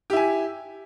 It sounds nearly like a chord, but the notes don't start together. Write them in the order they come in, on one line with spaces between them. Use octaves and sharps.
G4 E4 G#5